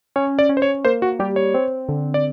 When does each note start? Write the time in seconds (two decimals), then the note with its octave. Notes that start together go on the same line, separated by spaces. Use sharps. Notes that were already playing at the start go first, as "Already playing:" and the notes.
0.16 C#4 C#5
0.39 D5
0.49 C#4
0.57 C5
0.62 C#5
0.84 A#3 C5
1.02 F#4
1.19 G3 G4
1.36 C#5
1.54 C4
1.89 D3
2.14 D5